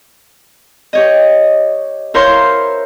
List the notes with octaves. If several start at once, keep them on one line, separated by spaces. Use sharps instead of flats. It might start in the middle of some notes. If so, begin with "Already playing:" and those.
G4 C#5 D#5
E4 A#4 C5 C#5 F5 C6